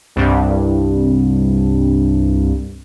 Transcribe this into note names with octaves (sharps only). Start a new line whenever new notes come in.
C2 G2